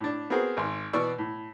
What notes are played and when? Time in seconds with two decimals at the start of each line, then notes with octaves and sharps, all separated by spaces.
0.01 A2 D4
0.30 B3 C4 F#4 G#4 A#4 C5
0.57 G#1 C6
0.93 B2 E3 B3 D5 C#6 E6
1.18 A2